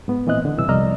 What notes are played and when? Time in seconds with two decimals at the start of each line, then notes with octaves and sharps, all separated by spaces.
0.08 G#2 B3
0.27 A#2 E3 C4 D#5 F#6
0.45 D3
0.57 C2 G2 B2 E3 E6
0.69 C2 F2 D5 D#5 A#5 F6